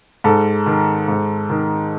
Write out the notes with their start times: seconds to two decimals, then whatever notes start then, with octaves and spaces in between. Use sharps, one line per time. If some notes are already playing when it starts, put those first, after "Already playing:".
0.24 G#2 A4
0.66 D#3
1.08 G#2
1.50 D#3